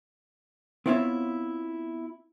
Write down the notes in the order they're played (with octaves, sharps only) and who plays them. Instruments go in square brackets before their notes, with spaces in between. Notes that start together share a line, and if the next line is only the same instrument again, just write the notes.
[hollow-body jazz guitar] B3 C4 E4 F4 C#5 E5